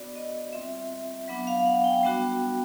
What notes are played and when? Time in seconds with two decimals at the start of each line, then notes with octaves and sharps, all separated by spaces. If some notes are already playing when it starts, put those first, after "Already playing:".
Already playing: B3 D4 F#4 D5
0.16 D#5
0.52 G3 C4 F4 E5
1.28 F#3 B3 D4
1.47 F5
1.66 F#5
1.84 G5
2.03 G3 B3 D4 F#4